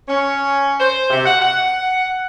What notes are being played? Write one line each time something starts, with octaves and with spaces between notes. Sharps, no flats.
C#4
C5
C3
F#5
F#5